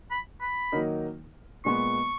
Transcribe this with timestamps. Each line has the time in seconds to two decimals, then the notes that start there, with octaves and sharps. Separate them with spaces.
0.11 B5
0.41 B5
0.72 D#3 F#3 A#3 D#4 A#4
1.65 A#2 G#3 B3 C#6